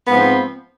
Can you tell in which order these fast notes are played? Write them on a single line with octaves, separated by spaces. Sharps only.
B3 G#2 F3 C4